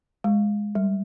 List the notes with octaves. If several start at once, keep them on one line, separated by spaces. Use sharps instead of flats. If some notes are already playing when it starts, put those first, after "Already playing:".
G#3
G3